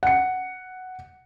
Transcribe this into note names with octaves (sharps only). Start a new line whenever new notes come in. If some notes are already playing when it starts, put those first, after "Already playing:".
F#5 C#7